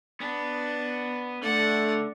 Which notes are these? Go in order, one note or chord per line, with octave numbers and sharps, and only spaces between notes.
B3 D4
D3 A3 D5 F#5